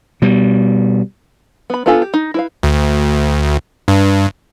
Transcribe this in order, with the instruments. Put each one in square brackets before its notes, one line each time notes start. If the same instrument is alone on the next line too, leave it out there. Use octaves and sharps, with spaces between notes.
[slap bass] B2 G3
[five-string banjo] B3 B5
B3 D4 F4 A4 G#5
G4
D#4
E4 B4 F5
[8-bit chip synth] D2
G2